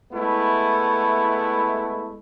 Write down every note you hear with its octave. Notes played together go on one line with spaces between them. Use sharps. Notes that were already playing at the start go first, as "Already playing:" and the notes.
G#3 A3 B3 E4